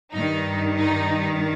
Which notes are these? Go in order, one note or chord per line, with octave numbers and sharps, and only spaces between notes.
G2 D#3 D#4
D#4